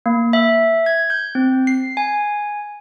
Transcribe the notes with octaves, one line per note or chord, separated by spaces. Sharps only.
A#3
E5
G#6
G6
C4
C7
G#5